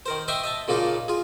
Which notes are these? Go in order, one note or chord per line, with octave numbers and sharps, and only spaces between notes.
D#3 A#4 C5
C5 D#5 E5 G5 C6 C#6
D#5 E5 A5
A#2 C#3 A#3 D4 D#4 F4
F4 G#4